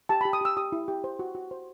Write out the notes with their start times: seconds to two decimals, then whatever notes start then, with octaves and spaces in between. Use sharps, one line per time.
0.09 G4 A5
0.21 G4 B5
0.33 D#6
0.41 G4 E6
0.57 G4 D#6
0.72 E4
0.88 G4
1.04 C5
1.19 F#4
1.35 F#4
1.51 C5